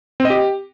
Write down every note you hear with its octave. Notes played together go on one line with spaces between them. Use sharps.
C4
D#5
G4